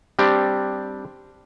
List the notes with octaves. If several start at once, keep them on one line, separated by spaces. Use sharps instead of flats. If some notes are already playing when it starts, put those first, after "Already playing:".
G3 C4 D4 G4